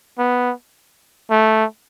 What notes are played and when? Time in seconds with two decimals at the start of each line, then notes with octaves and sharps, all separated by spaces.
0.18 B3
1.30 A3